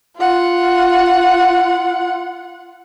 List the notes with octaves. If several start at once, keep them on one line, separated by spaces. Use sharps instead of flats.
F4 F#5